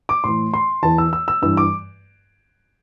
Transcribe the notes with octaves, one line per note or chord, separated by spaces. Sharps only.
D6
A2 E3 C6
C6
E2 E3 A5
E6
E6
E6
G2 E3 E6
D6